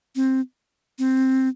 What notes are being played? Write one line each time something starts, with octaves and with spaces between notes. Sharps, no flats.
C4
C4